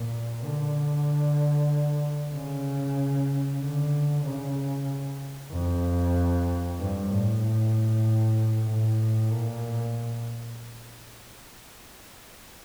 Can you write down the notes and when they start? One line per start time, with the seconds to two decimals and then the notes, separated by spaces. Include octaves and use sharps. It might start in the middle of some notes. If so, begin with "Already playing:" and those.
Already playing: A#2
0.44 D3
2.34 C#3
3.61 D3
4.24 C#3
5.52 F2
6.79 G2
7.10 A2
8.69 A2
9.33 A#2